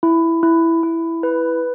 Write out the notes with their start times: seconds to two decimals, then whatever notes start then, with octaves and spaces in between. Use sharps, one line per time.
0.03 E4
0.43 E4
0.83 E4
1.23 B4